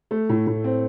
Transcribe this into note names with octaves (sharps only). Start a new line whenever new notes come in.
A3
A2
A2
C4